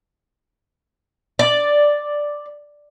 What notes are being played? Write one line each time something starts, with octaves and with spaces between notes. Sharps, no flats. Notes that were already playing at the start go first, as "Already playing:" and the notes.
D5